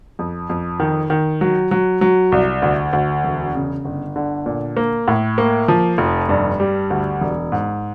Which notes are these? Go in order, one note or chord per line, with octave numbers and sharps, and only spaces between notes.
F2
F2
D#3
D#3
F#3
F#3
F#3
C2
D2
D2
E1
C#3
G1
D3
A#2
A#3
A2
A#3
F3
F1
G2
G3
D2
E1
G#2